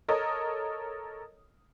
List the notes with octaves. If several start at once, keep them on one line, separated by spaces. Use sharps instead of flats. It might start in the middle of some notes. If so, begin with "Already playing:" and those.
A4 A#4 C#5 D#5 D#6